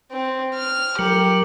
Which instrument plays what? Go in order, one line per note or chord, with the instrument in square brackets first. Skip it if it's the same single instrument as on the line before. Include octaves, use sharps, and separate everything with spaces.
[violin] C4
F6
[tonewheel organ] F#3 [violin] G4 [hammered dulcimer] A#4